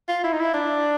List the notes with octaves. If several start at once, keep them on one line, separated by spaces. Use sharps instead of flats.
F4
E4
D#4
E4
D4